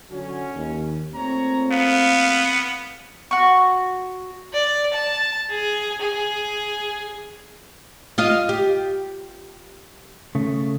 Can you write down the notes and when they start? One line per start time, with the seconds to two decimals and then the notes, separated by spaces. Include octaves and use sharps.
0.10 D3 F#3 C#4 F#4
0.55 D#2
1.14 A#2 A3 C4 C#5 A#5
1.71 B3 F5
3.31 F#4 C#6
4.53 D5
4.94 A5
5.50 G#4
6.01 G#4
8.18 F4 D#5 F5
8.49 G4
10.35 C#3 A3